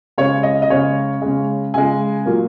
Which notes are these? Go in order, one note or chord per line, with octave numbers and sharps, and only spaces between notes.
C#3 G#3 C#5
D#5
D#5
C#3 G#3 C#5
C#3 G#3
C#3 G#3 G#5
A#2 F#3 A#3